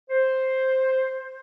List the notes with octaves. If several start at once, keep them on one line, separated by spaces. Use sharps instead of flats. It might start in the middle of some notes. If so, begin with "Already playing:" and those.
C5